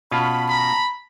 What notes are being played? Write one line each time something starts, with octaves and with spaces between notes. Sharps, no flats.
B2 C#4 F4 A5 B5
A#5 B5